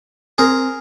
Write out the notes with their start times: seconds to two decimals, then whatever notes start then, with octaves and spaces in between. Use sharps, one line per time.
0.38 C4 G#4 A#4